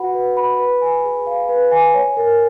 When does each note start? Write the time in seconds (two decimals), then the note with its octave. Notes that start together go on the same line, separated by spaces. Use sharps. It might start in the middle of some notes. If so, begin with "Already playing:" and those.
Already playing: F#4 B4 F#5 B5
0.15 B4
0.37 B5
0.59 B4
0.81 G#5
1.04 G#4
1.27 F5
1.49 B4
1.71 G#5
1.94 C#5
2.17 A#4